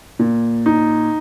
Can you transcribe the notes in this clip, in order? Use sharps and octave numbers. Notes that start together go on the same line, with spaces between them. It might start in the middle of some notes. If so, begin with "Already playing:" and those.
A#2
D#4